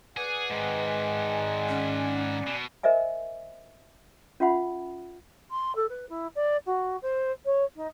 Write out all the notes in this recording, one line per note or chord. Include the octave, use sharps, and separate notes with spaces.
G#4 B4 D5 F#5 G#5
G#2 D#3 G#3
C#4
B2
A#4 C5 D#5 E5 G#5
C#4 F4 E5 F#5 B5
C6
A4
B4
E4
D5
F#4
C5
C#5
D#4